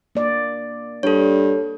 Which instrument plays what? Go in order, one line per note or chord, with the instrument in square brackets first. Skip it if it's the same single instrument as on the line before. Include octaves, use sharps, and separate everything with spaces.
[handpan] A#3 D5
[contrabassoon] G2 [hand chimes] A4 C#5